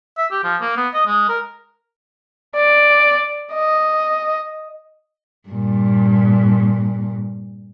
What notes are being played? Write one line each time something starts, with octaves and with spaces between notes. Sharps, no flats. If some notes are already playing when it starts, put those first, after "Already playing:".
E5
G4
F3
A#3
B3
D#5
G#3
A#4
D5
D#5
G2 A#2